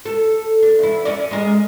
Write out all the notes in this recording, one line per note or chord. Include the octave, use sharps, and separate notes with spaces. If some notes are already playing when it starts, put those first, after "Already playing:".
A4
D4
E2 E4
C#4 A#4 D5
G#3 A#4 D#5